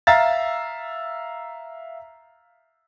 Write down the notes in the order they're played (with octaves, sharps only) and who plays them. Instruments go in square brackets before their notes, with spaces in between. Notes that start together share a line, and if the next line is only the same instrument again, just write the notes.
[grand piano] E5 F5 A#5 E6 A6